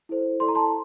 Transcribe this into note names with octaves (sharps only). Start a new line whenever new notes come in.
E4 A4 C5
E4 A4 D5 C6
A#5
A5 C6